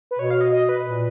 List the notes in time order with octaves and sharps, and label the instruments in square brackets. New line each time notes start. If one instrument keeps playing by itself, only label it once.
[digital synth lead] B4
[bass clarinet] B2 [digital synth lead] C#5
[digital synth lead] F5
D#5
D#5
B4
[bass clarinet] A#2